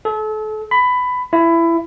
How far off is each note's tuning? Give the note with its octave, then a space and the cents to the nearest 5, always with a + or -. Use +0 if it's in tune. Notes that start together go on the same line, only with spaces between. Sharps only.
A4 -35
B5 +15
E4 +20